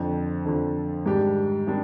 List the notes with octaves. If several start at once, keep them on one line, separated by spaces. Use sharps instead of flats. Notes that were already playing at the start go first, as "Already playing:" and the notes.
Already playing: F2 D3 F3
F2 D3 F3
G#2 D#3 G3 D4 G4
D#3 G3 D4